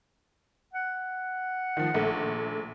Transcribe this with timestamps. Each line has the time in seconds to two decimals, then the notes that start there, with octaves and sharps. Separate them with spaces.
0.74 F#5
1.77 D#3 F3
1.94 A#1 A3